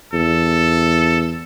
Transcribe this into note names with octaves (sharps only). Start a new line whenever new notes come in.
E2 A4